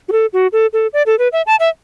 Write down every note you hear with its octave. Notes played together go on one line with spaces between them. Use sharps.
F#4
A4
F#4
A4
A4
D5
A4
B4
E5
A5
E5